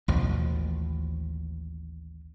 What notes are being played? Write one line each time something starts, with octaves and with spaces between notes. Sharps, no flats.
A1 D#2 B2 F3